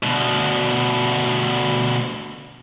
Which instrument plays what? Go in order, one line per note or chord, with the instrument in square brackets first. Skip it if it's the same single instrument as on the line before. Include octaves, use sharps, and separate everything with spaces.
[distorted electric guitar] D2 B2